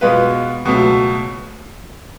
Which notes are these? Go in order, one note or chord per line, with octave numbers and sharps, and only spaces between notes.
B2 G#3 B3 F4 B4
C#2 B2 F#3 A3